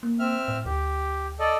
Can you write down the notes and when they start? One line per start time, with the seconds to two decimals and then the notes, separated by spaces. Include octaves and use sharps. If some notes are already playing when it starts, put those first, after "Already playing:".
0.03 A#3
0.19 C4 E5 F6
0.48 A2
0.66 D2 G4
1.39 A4 D5 D#5